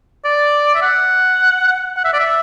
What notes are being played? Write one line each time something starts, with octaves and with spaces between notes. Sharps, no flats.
D5
E5
F#5
F#5
E5
D5
E5